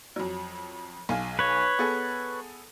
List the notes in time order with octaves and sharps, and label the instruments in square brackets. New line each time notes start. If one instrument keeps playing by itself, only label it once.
[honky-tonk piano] F2 F#3
B1 F5 G#5
[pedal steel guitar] B4 C#5
[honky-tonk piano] B3 G#4 A4